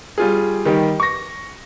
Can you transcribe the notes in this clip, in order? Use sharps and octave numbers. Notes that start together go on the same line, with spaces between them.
G3 F4 G#4
D#3 G3 G4
C#6 A#6